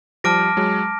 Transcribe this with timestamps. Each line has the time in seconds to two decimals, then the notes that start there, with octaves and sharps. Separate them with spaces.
0.24 F3 G3 A5 D6 F6 A#6 D7
0.57 F#3 G#3